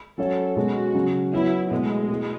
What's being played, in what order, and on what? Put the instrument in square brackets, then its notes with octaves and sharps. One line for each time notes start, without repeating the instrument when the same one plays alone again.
[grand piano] F#3 C#4 F#4 C#5 [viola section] A4
[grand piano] B2 G#3 C#4 [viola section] F#4
[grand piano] C#3 F#3 C#4
[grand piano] F#3 B3 F#4 C#5 [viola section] E4
[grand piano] B2 A3 E4 A4 [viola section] G#3
[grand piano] B2 A3 E4 G#4